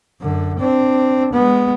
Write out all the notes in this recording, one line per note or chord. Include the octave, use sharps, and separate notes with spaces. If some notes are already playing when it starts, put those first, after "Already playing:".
F#2 D3
C4 D4
G#3 B3